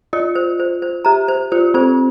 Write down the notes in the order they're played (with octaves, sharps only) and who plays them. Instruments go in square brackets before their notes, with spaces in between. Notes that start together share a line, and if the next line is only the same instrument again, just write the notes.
[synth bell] F4 [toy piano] D#5
[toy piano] C5
C5
C5
[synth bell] G4 [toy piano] A#5
[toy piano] C5
[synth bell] F4 [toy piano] C5
[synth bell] C4 [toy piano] C5